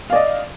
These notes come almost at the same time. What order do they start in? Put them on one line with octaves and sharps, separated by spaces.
F5 D5 D#5